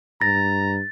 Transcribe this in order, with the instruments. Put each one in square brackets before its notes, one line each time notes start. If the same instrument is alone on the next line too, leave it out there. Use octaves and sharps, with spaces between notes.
[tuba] G2 [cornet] A#5 [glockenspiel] A6 [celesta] A#6